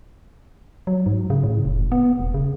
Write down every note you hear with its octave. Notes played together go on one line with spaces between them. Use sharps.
F#3
G#2
C#3
A2
F1
B3
E1
C#3